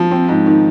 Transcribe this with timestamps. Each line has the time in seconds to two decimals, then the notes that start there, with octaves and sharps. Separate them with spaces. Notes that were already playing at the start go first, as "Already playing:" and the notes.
Already playing: F3
0.11 C4
0.29 G#2
0.46 D#3